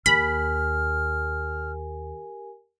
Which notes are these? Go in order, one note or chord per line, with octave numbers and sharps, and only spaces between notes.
D#2 G4 A#4 G#5 B5 F6